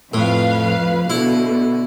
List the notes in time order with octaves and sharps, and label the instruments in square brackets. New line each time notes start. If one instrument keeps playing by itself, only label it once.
[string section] F2 B4 F5 [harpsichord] A2
[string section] B2 D3 [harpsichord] E4